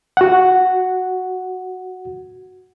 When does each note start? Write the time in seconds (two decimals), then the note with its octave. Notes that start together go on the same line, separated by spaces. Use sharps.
0.17 F#4 F#5